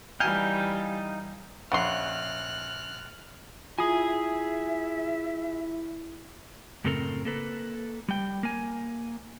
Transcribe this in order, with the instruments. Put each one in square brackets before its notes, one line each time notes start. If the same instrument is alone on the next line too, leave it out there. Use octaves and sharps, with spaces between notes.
[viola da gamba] E3 G3 [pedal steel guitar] D#4 F5 G5 [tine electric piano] G#5 F6
[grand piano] A#1 F#5 [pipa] C#3 C6 [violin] F6 F#6
[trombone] E4 [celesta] F4 D#6 [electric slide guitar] G#4 G#5 [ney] E5
[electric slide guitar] F#2 A2 C#3 C4 A4 A#4
A#3 A4 B4
G3 G5
A#3 G#5